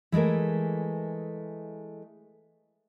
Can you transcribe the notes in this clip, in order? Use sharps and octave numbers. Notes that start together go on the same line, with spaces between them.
E3 G#3 A3 A#4